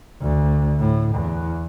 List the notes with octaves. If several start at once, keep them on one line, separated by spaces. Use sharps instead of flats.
D2
A2
E2